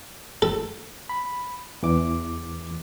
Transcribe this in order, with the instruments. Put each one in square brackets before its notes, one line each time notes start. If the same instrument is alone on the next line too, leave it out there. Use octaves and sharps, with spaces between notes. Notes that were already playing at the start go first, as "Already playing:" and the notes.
[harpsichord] A4
[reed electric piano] B5
E2 E3 D6